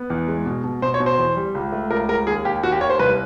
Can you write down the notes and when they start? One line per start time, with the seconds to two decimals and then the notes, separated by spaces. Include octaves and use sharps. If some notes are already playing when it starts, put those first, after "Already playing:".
Already playing: B3
0.10 E2
0.28 G#3
0.46 B2
0.64 B2
0.82 B2 C5
0.94 C#5
1.00 B2
1.06 C5
1.18 E2
1.36 G3
1.55 C#2
1.72 A3
1.91 C#2 A#4
2.09 G#3 A#4
2.27 D#2 G#4
2.44 D#2 G4
2.63 D#2 F#4
2.72 G4
2.81 D#2 C#5
2.90 C5
2.99 C2 B4